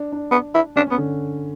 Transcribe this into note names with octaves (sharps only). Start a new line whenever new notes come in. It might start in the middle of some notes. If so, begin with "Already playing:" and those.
Already playing: D4
D4
B3
E4
C#4 D4
C#4
B3
D3